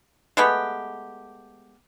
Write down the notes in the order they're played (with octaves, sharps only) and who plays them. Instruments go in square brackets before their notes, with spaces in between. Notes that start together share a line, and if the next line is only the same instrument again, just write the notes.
[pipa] G#3 A3 B3 G4